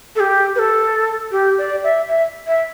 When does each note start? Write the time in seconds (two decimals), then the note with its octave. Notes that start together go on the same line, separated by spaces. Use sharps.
0.16 A4
0.20 G4
0.55 B4
0.59 A4
1.32 G4
1.58 D5
1.84 E5
2.09 E5
2.47 E5